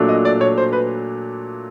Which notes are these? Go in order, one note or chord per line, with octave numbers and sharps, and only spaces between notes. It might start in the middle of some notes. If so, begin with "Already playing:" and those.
Already playing: A#2 F#3 A3 D4
D#5
D5
C#5
C5
B4